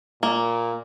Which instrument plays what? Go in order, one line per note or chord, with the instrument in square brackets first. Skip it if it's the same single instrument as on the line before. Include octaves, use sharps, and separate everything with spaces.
[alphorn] A#2 [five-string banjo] A#3